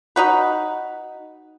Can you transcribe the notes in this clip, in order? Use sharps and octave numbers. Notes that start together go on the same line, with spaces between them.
D#4 F#4 B4